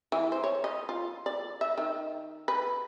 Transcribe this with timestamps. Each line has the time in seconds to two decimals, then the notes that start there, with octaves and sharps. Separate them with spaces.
0.12 E3
0.32 C5
0.44 C#5
0.64 D#5
0.89 F4
1.26 D5
1.61 E5
1.78 D#3
2.48 B4